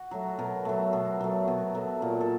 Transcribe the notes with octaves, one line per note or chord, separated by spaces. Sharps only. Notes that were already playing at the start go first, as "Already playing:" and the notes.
Already playing: F#4
F#3 A3
B2 A#4
F#3 A3
B2
F#3 A3
B2
F#3 A3
A#2 A#4
A4